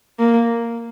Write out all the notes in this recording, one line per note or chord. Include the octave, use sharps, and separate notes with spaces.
A#3